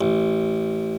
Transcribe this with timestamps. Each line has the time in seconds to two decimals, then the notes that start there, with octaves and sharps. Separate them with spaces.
0.01 A1